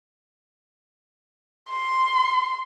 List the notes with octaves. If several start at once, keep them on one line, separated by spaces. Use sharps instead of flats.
C6